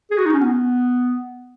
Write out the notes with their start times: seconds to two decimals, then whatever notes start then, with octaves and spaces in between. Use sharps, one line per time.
0.11 G#4
0.18 F#4
0.26 D#4
0.33 C#4
0.41 B3